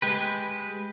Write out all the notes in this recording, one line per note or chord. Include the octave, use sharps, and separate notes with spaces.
G#3 G4 B4